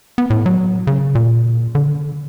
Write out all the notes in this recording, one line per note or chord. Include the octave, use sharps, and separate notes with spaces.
B3
A2
F#3
C#3
A#2
D3